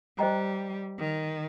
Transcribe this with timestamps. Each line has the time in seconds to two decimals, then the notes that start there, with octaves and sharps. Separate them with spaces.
0.18 G3 C5 D#5 G5 A#5
0.99 D#3